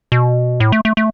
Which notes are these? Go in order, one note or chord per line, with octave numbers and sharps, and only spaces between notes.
B2
A2
A3
A3
A3